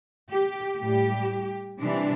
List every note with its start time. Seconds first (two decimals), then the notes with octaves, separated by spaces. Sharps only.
0.29 G4
0.80 A2 G3 G4
1.81 C3 E3 G3 D4